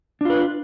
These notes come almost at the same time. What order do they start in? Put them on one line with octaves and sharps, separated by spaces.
D4 F4 B4